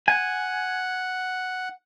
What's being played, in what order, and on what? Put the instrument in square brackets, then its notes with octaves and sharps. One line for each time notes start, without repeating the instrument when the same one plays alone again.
[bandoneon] F#5 [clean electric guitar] G#5